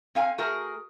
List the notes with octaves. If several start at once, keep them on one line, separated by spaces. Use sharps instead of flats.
C4 F5 G#5
A3 F#4 G#4 A#4